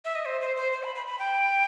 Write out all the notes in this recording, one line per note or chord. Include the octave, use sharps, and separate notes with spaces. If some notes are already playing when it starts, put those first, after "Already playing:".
E5
D#5
C5
C5
C5
C5
B5
B5
B5
G5